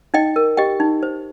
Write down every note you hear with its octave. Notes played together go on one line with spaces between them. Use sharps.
D#4 D#5 G5
A#4
G4 D#5 G5
D#4
C5